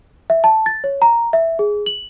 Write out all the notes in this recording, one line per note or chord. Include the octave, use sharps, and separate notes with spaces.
E5
A5
A6
C#5
A#5
E5
G#4
F#7